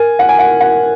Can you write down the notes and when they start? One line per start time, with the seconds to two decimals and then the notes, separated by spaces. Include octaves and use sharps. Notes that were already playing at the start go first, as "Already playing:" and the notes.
Already playing: A#4 G#5
0.19 F#5
0.29 G#5
0.39 F#5
0.60 F#5